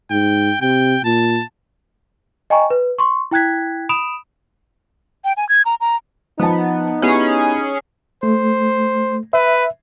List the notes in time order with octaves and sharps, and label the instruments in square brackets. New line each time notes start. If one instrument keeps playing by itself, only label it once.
[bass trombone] G#2 [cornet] G5
[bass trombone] C3 [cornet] G5
[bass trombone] A#2 [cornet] A5
[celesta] D#5 G5 G#5 A#5 C#6
B4
C6 C#6
E4 G5 F#6 G#6 B6
B5 D#6 D7 E7 F7
[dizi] G5
G#5
G#6
A#5
A#5
[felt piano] F3 A5 [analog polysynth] B3 [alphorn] D#4
[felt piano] B3 E4 G4 [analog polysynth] C#4 G#4
[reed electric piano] A3 [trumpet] C5
[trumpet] B4 [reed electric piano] E5